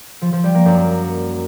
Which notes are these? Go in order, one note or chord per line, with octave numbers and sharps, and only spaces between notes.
F3
F3
G3
A#3
F#2